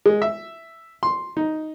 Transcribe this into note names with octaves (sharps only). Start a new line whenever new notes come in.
G#3
E5
C6
D#4